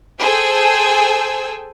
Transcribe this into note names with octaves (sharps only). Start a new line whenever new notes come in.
G#4 A4 C5 G5 G#5 E6